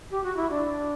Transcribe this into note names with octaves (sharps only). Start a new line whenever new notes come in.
G4
F#4
E4
D4